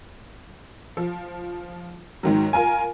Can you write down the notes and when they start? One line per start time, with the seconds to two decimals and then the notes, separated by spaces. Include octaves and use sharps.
0.97 F3
2.23 G#2 D#3 F#3
2.53 F4 A#4 G#5